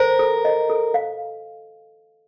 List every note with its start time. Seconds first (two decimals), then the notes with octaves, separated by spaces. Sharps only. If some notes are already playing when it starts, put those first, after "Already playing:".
Already playing: A#4 C5
0.19 A4
0.45 D#5
0.70 A4
0.94 F5